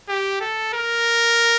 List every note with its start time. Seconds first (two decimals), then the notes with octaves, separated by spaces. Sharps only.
0.09 G4
0.41 A4
0.73 A#4